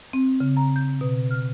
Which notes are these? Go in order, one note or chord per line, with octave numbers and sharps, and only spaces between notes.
C4
C#3
A#5
G6
B2
F6